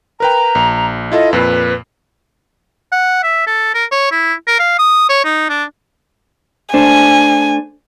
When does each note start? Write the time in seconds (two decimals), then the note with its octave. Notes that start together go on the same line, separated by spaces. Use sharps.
0.20 A#4 B4 G5 A#5
0.55 A#1
1.12 E4 F4 A4 D#5
1.33 F2 A#2 B4 C7
2.92 F#5
3.23 E5
3.47 A4
3.75 A#4
3.92 C#5
4.12 E4
4.48 A#4
4.59 F5
4.79 D#6
5.09 C#5
5.25 D#4
5.49 D4
6.74 A3 D4 C5 G#5